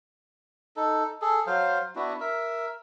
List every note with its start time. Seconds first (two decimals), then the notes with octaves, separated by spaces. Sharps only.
0.76 D#4 A4
1.22 G#4 A4
1.47 F#3 C5 F5
1.96 B3 D4 E4 F#4
2.20 A#4 E5